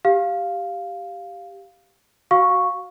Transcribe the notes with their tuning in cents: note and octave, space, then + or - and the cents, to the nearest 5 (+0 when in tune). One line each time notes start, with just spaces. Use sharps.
G4 +0 F5 +0
F#4 +0 F5 +20 C#6 +0